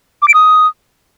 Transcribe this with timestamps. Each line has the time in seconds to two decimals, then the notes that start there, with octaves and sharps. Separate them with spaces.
0.22 D6
0.28 D7
0.34 D#6